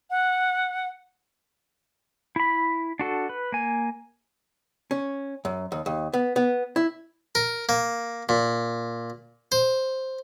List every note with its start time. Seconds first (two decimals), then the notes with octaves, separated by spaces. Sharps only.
0.10 F#5
2.36 E4 B5
2.99 D4 F#4 A4
3.29 B4
3.52 A#3 G#5
4.91 C#4
5.45 F#2
5.72 D#2
5.86 D#2
6.13 B3
6.36 B3
6.76 E4
7.35 A#4
7.69 A#3
8.29 A#2
9.52 C5